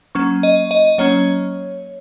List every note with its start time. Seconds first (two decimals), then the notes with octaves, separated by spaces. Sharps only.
0.15 F#3 A#3 C#4 C#6
0.43 D#5
0.71 D#5
0.98 F#3 A#3 C#4 C#5